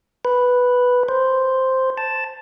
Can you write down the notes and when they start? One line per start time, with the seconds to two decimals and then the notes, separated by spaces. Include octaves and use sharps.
0.25 B4
1.09 C5
1.98 A5